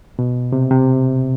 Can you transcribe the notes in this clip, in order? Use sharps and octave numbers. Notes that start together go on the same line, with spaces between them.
B2
C3
C3